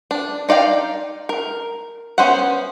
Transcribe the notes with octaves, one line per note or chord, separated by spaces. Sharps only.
D4
D#4 D5 F5 G5
A#4
B3 C#4 C5 E5 F#5